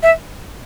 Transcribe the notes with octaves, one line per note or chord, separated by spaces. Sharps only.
E5